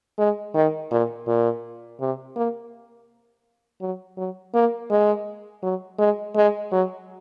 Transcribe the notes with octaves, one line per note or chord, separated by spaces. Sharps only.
G#3
D#3
A#2
A#2
C3
A#3
F#3
F#3
A#3
G#3
F#3
G#3
G#3
F#3